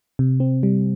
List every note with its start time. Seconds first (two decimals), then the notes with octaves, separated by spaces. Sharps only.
0.19 C3
0.40 C4
0.63 G3